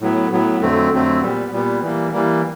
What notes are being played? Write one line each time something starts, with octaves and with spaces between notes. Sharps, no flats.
A2 F#3 B3
A2 F#3 B3
F2 D3 F#3 A3 C4
F2 D3 F#3 A3 C4
A#2 G3 B3
A#2 G3 B3
E3 G3 A#3
E3 G3 A#3